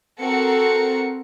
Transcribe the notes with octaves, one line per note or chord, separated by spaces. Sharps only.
C4 F#4 A4 A#4 C#7